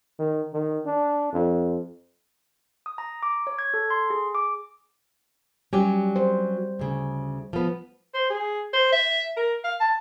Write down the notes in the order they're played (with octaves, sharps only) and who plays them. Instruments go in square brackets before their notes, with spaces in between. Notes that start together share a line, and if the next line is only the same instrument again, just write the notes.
[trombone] D#3
D#3
D4
F2
[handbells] D#6
A#5
D6
C#5
G#6
A4
C6
G#4
D6
[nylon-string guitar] F#3 C#4 G4 [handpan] G3
[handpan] C5
[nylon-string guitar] D2 C#3
F3 B3
[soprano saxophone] C5
G#4
C5
E5
A#4
F5
A5